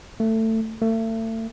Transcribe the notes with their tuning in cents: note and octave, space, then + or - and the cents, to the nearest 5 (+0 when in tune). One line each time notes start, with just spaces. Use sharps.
A3 +20
A3 +35